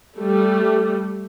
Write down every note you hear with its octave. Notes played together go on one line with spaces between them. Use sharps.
G3 A3